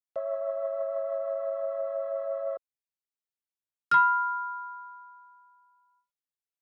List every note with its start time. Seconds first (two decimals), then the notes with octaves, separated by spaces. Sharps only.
0.16 C#5 E5
3.91 B5 F6